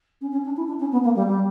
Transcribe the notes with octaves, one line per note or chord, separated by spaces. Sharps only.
C#4
C#4
D4
E4
D4
C#4
B3
A#3
G3
G3